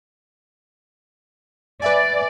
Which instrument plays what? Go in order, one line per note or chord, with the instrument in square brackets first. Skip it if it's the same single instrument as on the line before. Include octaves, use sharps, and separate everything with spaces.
[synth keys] B4 E5 G#5 [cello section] D5